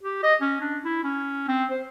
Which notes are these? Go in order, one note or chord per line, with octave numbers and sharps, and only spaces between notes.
G4
D#5
C#4
D4
E4
C#4
C4
C5